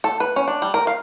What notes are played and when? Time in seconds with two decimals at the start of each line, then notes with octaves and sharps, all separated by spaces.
0.04 A4
0.20 B4
0.36 C#4
0.48 D4
0.62 G3
0.74 A#4
0.87 F5